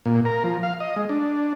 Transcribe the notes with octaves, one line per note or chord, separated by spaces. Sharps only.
A#2
A#4
F3
F5
D#5
G#3
D4